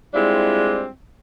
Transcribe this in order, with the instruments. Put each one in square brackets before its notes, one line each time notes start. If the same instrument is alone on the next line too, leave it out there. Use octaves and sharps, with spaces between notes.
[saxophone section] G3 G#3 C4 D4 E4 F4